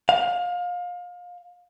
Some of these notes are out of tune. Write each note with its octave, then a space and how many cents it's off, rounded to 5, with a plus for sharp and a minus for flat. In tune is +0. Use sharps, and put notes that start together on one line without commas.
F5 +30